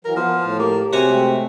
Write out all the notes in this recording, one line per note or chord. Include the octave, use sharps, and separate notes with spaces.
E3 F#3 A#4
F3 B3 F6
A2 A5
A#3 G4
C3 F#4 G#4 C#5 G#5
G#3 A3 C4